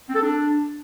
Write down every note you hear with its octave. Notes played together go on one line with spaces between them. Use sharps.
C4
A4
D4